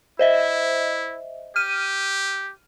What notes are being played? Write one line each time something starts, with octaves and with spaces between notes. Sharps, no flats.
E4 C5 D#5 E5
G4 F6 D#7